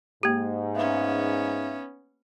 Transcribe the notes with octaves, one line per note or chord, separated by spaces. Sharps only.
G#2 A#3 G4
B3 C#4 D#4 E5 F5